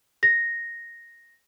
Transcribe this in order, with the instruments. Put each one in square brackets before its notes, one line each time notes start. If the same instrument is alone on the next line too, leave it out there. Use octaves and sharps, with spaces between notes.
[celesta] A#6